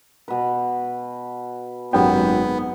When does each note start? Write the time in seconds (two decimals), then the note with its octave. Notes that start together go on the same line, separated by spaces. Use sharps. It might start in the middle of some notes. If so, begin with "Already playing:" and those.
0.28 B2 B4
1.93 G#1 F#2 B3 G5